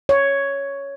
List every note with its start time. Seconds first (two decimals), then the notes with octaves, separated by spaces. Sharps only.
0.09 C#5